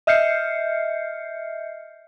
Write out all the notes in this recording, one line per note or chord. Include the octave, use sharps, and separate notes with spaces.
D#5 E5 F6 G6 C7 C#7